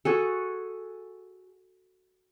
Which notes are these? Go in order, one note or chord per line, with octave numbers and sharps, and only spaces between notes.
F#4 G#4 A4